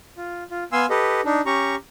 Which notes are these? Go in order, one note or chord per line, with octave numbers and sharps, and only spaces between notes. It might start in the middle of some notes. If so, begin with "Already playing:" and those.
F4
F4
B3 F5 G#5 C6 E6
G4 A4 B4 D#5
D4 D#4
C#4 G4 A#5 C#6